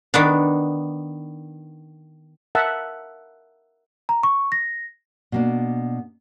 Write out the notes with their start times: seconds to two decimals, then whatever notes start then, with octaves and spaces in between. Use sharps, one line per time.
0.14 D#3 B3 D4
2.55 A#4 E5 F#5 A5
4.09 A#5
4.23 C#6
4.52 A#6
5.32 B2 A#3 D4